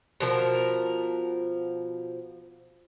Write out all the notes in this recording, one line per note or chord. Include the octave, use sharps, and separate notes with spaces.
B2 F3 A#4